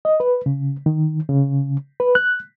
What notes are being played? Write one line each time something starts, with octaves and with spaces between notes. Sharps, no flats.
D#5
B4
C#3
D#3
C#3
B4
F#6